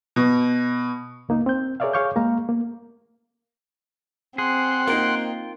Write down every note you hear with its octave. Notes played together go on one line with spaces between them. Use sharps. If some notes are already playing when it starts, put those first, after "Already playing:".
B2
C#2 A#3 D#4
C4 G6
G#4 A#4 C#5 D5 E5 F5
G#4 C#5 F5 C#6 D6 G6
G#3 A#3 F5 A#5
A#3
C4 G#4 F#5 C6
A#3 D#4 F4 G5